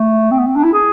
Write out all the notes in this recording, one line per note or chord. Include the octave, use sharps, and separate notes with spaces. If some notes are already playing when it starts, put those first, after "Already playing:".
Already playing: A3
C4
B3
C4
D4
E4
G#4